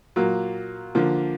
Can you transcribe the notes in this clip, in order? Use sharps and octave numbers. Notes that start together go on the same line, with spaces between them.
A#2 F#3 A#3
D3 F3 A#3